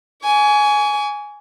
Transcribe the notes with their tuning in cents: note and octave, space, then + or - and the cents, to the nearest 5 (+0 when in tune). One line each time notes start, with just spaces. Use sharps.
G#5 +10 C#6 +45